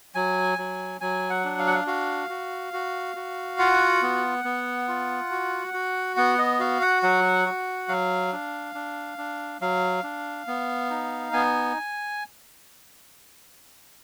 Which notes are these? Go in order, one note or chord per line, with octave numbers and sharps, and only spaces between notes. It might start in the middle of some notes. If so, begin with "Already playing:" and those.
F#3 G#5
F#3
F#3 G#5
F#5
D4
F5
F#5
F5
F#4 F5
F#4
F#4
F#4
F4 F#5
B3
B3
F4
F#4
F#4
B3 F#5
D#5
F#4 F5
F#5
F#3 F#5
F#4
F#3 F5
D4
D4
D4
F#3 F5
D4
B3
D#4
B3 G#5